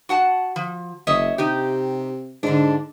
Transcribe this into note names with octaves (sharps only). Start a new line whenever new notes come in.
F#4 F#5 A5
F3
F#1 C#5 D#5 E5
C3 D#4 G4
G#2 D3 D4